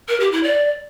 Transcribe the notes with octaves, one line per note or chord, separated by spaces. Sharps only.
A#4
G4
E4
D5